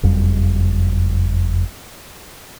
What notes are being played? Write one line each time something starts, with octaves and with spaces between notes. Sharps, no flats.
F#1 F2 G3